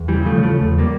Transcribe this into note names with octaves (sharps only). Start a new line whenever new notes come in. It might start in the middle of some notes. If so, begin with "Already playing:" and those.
Already playing: E2
E3 G3
C#3
F3 A3
C#3
F3 A3
E2
G3 A#3